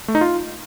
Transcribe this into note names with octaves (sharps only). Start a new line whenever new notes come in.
A3
D#4
F4